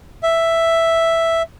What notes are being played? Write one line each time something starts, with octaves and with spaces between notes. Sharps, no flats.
E5